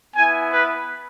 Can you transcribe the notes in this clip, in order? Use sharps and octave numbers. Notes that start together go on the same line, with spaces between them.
B3 E4 G#5
B4